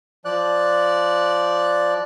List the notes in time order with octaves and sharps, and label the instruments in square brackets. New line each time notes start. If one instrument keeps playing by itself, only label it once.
[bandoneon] F3 D5 F#6